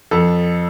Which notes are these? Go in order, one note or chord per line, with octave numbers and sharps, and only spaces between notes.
F2 A4